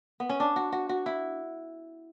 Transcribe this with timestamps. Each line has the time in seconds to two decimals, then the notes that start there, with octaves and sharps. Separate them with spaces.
0.20 B3
0.29 C#4
0.40 D4
0.56 F#4
0.72 F#4
0.89 F#4
1.06 E4